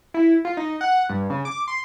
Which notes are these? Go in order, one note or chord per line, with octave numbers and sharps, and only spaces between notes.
E4
F4
D#4
F#5
G2
C#3
D6
C6